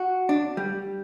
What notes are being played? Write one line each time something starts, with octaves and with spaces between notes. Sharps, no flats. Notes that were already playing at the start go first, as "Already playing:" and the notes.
Already playing: F#4
D4
G3